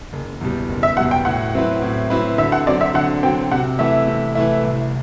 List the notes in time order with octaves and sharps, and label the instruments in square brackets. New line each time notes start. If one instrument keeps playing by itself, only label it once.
[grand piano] F#1
E2 B2 G3
F#1
[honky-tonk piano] E5
[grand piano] E2 B2 G3 [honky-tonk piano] F#5
[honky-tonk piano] G5
[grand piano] A2 [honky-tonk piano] F#5
[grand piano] F#3 C4 E4 B4
A2
F#3 C4 E4 B4
[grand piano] D3 [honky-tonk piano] E5
[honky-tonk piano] F#5
[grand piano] F#3 C4 [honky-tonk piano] D5
[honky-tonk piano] E5
[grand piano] D3 [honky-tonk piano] F#5
[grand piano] F#3 C4 [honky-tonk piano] G5
[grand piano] C3 [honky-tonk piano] F#5
[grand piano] E3 A3 E4 [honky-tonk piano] E5
[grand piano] C3
E3 A3 E4
C2